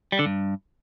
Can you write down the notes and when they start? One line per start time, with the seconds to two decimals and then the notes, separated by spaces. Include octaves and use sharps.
0.12 G3
0.19 D3
0.26 G2